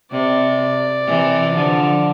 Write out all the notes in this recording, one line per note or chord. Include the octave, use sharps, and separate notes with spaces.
C3 D5
C3 E3
D3 F3